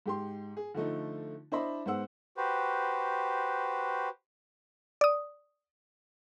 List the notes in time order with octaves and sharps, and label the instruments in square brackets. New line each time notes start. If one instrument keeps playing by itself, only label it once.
[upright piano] G#2 G4 C6
G#4
D3 F3 A3 D#4
D4 E4 C5 D#5 E5 B5
G#2 B3 C5 F#5 E6
[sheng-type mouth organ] F#4 G4 B4 C5
[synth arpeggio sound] D5 D#6